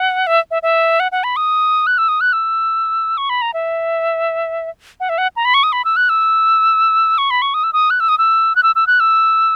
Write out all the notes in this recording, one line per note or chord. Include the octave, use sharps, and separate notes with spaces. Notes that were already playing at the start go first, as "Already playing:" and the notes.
Already playing: F#5
E5
E5
E5
F#5
F#5
B5
D#6
F#6
E6
D#6
F#6
E6
C#6
B5
A#5
E5
F#5
E5
F#5
A#5
B5
C#6
D#6
B5
E6
F#6
E6
C#6
B5
C#6
D#6
E6
D#6
F#6
E6
D#6
E6
F#6
E6
E6
F#6
E6